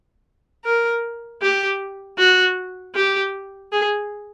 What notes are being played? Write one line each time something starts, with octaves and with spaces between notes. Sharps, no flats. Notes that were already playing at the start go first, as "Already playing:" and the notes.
A#4
G4
F#4
G4
G#4